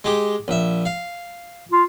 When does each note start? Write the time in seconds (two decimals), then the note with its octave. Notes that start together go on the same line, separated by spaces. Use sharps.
0.04 G#3 G4
0.48 A#1 E5
0.85 F5
1.72 F4